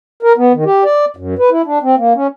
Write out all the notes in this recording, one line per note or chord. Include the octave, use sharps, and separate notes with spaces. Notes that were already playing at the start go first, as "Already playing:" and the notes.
A#4
B3
D#3
G4
D5
F#2
B4
E4
D4
C4
A#3
C#4